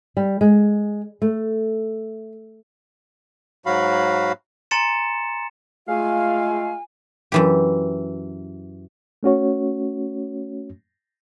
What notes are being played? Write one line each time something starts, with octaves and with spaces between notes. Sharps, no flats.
G3
G#3
A3
G#2 F#3 F#4 F5 B5
G#5 A#5 C6 A6 C#7 E7
G#3 A3 F4 F5 G#5
F#2 E3 G4
A3 C#4 F#4 C#5